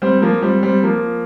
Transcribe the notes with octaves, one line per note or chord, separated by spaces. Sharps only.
G3 C4
F3 A#3
G3 C4
G3 C4
F3 A#3